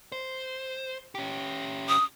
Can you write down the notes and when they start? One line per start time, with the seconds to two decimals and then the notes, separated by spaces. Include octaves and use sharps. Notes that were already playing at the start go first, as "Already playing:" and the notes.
0.12 C5
1.15 C#4 G4
1.89 D#6